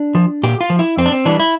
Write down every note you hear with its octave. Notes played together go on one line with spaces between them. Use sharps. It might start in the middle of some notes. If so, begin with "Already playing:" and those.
Already playing: D4
F3
A#2 G4
F4
F3
E4
F2 C4
D4
C4
E3 G3 D4
E4